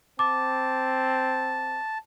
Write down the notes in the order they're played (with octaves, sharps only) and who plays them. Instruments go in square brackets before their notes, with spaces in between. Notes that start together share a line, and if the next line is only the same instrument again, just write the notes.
[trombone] C4 [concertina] A5 [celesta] D6